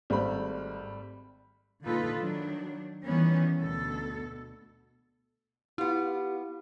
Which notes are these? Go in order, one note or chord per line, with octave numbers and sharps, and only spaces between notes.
G#1 G3 A3 B5
A#2 D3 D#4 F4 A4 B4
D#3 F#3 D4
D#3 E3 G3 B3 C#4
D2 B2 A4
B3 E4 F4 G4